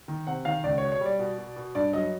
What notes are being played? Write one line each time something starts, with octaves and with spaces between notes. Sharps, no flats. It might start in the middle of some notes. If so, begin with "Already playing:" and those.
D#3
C3 F#5
D#3 F5
C#2 D5
B2 C#5
C#5
G3 D5
B2
B2
B2
G2 D5
F#3 D#5